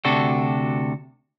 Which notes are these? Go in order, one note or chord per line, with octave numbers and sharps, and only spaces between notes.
D2 C3 D4 F#4 A4